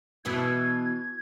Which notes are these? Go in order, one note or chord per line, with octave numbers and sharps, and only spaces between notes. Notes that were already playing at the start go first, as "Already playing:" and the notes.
B2 E3 E4 G#6